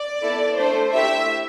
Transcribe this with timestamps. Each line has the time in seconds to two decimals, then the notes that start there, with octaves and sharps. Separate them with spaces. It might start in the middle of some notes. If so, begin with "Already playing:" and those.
Already playing: D5
0.22 B3 E4 A4
0.57 A3 D4 A4 C5
0.94 A3 E4 G4 E5